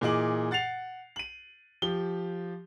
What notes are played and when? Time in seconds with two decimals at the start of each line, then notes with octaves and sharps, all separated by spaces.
0.01 A#2 E3 G#4 D#5 D6 F#7
0.51 F#5 A6 C7 F7
1.16 D#7 F#7
1.82 F3 G4 G7